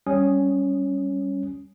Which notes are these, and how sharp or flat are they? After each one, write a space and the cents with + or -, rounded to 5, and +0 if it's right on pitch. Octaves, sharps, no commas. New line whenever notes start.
G3 +0 C#4 +0 D#6 +0